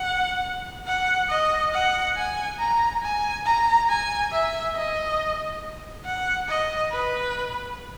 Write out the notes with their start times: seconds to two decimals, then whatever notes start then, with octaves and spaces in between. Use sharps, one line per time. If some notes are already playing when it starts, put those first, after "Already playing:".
Already playing: F#5
0.87 F#5
1.29 D#5
1.74 F#5
2.16 G#5
2.59 A#5
3.03 G#5
3.46 A#5
3.89 G#5
4.32 E5
4.75 D#5
6.05 F#5
6.48 D#5
6.91 B4